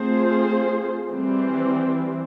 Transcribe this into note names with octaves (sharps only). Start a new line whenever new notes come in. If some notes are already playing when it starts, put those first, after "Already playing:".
Already playing: A3 C4 F4 G#4 C5
E3 G3 C4